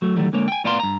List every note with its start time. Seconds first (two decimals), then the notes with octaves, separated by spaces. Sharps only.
0.02 F#3 A3
0.16 D#3 E3 F#3 G3 A3
0.33 D3 G#3 A#3 A#4 C#5
0.48 G5 G#5
0.64 A2 B3 D5 F5 A#5 C6
0.80 G2 A#5